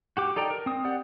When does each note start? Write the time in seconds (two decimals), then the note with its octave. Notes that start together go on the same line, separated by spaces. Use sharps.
0.17 F#4 G4 D6
0.36 D#4 A4 D5 G5 A#5
0.50 A#4
0.66 C4 D#6
0.85 G4 D5 F#5